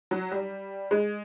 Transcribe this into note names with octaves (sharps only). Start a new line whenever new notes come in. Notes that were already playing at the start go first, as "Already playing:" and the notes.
F#3
G3
G#3